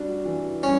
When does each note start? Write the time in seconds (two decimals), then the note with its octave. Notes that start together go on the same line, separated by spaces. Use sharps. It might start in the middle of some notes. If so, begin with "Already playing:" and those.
Already playing: G3 D4 F#4
0.26 E3
0.63 G3 C#4